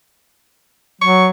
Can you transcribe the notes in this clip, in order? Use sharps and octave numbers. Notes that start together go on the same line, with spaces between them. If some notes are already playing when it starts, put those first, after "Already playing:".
F#3 C#6